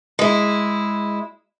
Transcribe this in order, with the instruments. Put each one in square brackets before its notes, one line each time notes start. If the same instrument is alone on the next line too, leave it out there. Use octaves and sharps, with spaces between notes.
[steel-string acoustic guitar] G#3 E4